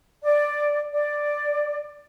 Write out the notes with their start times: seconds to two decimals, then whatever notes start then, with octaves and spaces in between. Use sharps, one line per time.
0.23 D5
0.93 D5